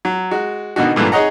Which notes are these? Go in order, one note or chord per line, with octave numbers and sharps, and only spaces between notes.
F#3
G#3 F#4
B2 D3 D#3 F#4
G2 A#2 E3 F#3 A3
D#4 G#4 C#5 D#5 F#5 A#5